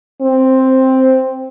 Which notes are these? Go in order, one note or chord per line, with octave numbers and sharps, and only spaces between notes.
C4